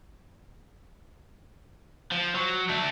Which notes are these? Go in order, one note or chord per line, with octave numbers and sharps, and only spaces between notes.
F3
F#3
A3 D4